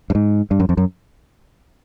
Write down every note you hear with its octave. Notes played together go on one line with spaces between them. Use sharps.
G2
G#2
G2
F#2
F2
F#2